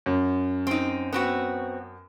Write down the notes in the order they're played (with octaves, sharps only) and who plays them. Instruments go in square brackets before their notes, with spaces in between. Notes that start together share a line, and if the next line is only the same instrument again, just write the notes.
[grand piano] F#2
[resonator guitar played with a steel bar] C4 D#4
B3 C4 F#4